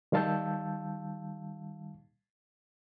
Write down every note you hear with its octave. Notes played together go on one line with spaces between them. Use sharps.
D#3 G3 F5 A5 E6 G6